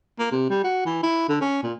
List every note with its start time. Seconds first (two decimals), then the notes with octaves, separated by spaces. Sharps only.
0.19 A#3
0.32 C3
0.50 G3
0.64 F#4
0.86 E3
1.03 E4
1.29 D3
1.41 C#4
1.63 A#2